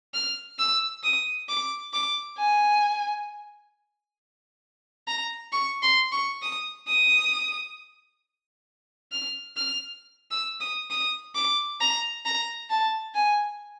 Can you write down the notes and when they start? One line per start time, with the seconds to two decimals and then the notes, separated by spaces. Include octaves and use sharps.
0.14 F6
0.59 E6
1.03 D#6
1.49 D6
1.93 D6
2.38 G#5
5.08 A#5
5.52 C#6
5.83 C6
6.12 C#6
6.42 D#6
6.87 D#6
9.12 F6
9.57 F6
10.31 E6
10.60 D#6
10.91 D#6
11.35 D6
11.81 A#5
12.25 A#5
12.70 A5
13.15 G#5